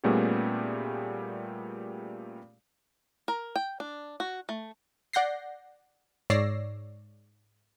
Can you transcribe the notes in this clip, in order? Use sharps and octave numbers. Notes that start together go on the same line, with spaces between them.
A#2 G3 A3 B3 C#4 G#4
A#4
G5
D4
F#4
A3
D5 F#5 G6 A#6 C7
G#2 C#5 D5 E6 A#6 C7